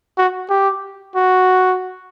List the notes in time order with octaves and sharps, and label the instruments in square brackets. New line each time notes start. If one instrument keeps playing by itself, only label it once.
[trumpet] F#4
G4
F#4